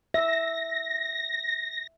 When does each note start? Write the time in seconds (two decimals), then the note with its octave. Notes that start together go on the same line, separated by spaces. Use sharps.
0.14 E5 A#6